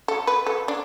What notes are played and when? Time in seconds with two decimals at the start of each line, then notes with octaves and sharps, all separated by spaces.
0.08 A4
0.27 B4
0.46 A4
0.68 D4